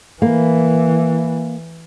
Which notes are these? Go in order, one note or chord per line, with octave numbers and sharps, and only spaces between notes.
E3 A#3